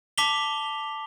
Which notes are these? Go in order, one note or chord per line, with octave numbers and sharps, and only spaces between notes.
A5 D6 B6 F7 G7